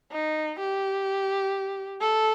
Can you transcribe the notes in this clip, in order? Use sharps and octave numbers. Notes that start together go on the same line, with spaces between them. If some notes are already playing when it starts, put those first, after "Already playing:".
D#4
G4
A4